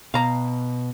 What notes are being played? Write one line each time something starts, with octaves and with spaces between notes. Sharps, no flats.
B2 F5 A#5